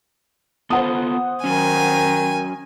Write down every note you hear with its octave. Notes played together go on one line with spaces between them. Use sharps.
B3 F4 A4 C5 F#5 D#6
D#3 F#3 C#4 G#5